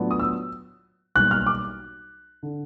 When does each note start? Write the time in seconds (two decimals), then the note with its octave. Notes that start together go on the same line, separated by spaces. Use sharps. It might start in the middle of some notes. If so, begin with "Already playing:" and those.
Already playing: A2 F#3 B3 D4 F4
0.11 D#6
0.19 E6
1.15 B1 B2 G3 A#3 F#6
1.31 F6
1.46 D6
2.43 D3